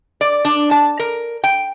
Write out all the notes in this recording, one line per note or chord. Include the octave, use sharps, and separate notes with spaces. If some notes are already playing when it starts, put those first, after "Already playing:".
D5
D4
A5
A#4
G5